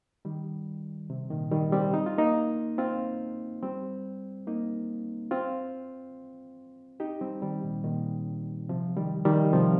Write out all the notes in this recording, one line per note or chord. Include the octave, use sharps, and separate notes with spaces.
D#3 G3
C3
A#2 D#3
D#3 G3
G3 C4
D#4
F4
A#3 D#4
C4 F4
G3 C4
A#3 D#4
C4 F4
D#4 G4
G3 C4
D#3 G3
A#2 D#3
A#2 D#3
C3 F3
D#3 G3
D#3 G3
C3 F3